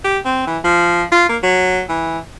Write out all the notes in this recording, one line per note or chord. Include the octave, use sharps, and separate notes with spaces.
G4
C4
E3
F3
F4
A#3
F#3
E3